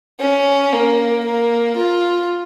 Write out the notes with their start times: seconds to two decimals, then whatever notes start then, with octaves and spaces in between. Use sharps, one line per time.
0.20 C#4
0.72 A#3
1.25 A#3
1.77 F4